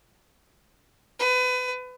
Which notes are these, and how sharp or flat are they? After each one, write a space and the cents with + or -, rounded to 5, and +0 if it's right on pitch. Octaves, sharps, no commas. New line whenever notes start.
B4 +30